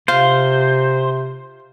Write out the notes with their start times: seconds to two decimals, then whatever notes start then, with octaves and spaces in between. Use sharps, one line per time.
0.08 C3 F4 C5 F5